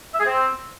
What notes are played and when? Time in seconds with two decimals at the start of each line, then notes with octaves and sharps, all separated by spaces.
0.15 E5
0.20 G#4
0.26 C4